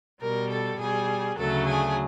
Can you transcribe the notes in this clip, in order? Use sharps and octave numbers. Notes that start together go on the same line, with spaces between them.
B2 G3 A#4
A4
B2 G3 G#4
D2 C#3 F#3 A3 A4
G#4